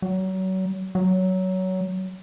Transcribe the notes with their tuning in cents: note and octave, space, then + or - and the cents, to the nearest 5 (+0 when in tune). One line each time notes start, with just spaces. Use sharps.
F#3 +30
F#3 +15